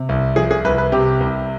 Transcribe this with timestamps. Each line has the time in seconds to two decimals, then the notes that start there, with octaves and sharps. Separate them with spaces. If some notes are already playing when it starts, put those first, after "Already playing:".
Already playing: C3
0.09 C2
0.36 F3 G#4
0.51 G#4
0.65 C2 B4
0.78 B4
0.92 C3 G4
1.21 C2